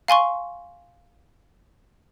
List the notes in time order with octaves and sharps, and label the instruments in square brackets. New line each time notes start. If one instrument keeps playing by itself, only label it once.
[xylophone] F5 G#5 C6 C#6